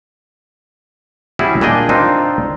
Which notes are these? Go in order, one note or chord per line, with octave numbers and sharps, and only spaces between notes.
G3 C#4 E4 F#4 G#4
A#2 D4 G#4 D#5 G5
C4 D4 D#4 F4